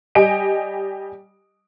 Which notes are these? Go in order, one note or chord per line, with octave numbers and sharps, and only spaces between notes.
G3 G4 D#5 G#5 D7